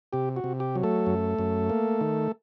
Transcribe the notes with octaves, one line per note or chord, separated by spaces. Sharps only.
C3 G4
F#4
C3
G4
F#3
A3 A4
F#2
F#2
A#3
D#3